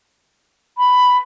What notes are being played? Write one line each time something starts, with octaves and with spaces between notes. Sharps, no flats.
B5